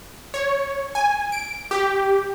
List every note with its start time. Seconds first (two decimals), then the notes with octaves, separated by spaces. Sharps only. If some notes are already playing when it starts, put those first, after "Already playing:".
0.34 C#5
0.95 G#5
1.32 D7
1.71 G4